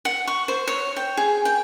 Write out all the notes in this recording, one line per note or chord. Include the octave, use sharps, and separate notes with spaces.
F#5
C#6
C5
C#5
G5
G#4
G5